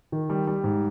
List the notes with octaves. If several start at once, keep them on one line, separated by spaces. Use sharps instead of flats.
D#3
G3
G3
G#2